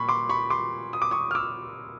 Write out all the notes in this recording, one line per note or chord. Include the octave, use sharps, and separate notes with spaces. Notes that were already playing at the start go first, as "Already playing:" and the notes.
Already playing: A#2 B5 C#6
C6 D6
B5 C#6
C6 D6
D#6
D6
C#6 D#6
F6
D6 E6